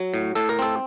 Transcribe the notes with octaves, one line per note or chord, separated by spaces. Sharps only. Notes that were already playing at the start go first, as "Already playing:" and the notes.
Already playing: F#3
A2
A2 A4
A#4
C4 A4